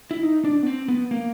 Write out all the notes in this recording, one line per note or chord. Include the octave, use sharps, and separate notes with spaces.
E4
D#4
D4
B3
C4
B3
A#3